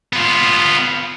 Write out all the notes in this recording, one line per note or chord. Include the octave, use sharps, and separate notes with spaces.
B3 F4